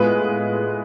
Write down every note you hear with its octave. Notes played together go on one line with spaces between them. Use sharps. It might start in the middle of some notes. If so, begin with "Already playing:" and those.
Already playing: A2 G#3 B3 F4 G#4 B4